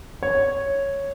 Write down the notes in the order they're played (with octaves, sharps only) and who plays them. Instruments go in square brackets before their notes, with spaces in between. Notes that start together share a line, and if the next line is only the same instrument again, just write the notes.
[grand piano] C#5